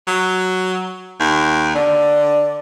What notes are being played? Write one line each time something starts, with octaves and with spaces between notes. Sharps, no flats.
F#3
D#2
D3 D5